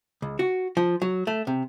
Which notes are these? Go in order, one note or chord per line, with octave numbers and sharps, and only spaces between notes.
C#2
F#4
F3
F#3
A3
C3